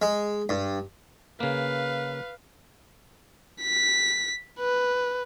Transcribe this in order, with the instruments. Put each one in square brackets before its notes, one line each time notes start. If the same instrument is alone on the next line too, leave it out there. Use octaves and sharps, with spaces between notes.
[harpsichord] G#3
G2
[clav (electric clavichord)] C#3 A#3 [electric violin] B4 F5
[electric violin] B6
B4